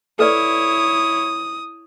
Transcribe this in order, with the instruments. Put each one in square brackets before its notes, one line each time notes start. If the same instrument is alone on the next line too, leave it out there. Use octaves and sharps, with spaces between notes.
[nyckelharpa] E4 C#5 [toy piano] A4 B4 D5 [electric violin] D#6